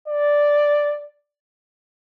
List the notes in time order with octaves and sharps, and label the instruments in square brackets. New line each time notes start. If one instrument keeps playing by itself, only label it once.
[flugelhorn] D5